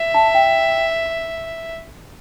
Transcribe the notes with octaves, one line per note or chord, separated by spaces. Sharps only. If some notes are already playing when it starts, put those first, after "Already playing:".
Already playing: E5
A5
G5